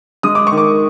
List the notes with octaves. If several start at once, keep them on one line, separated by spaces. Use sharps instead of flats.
G#3 D#6
D6
D#3 C#6
D6